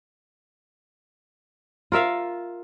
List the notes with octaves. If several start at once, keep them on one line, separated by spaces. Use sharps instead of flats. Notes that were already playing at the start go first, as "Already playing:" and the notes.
F4 A#4 E5 F5